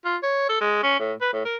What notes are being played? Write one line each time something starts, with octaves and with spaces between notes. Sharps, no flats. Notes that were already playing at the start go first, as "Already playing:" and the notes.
F4
C#5
A4
G#3
C#4
A2
B4
A2
A#4